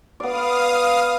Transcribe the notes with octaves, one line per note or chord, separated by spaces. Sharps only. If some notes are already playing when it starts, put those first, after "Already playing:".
B3 D5 F5 D#6